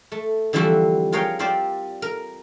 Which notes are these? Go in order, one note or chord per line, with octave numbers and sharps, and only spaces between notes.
A3
D3 E3 F3 G3 C4 F#4
F4 G#4 A#4 C#5 F5 G5
C4 F4 G4 C5 D5
A#4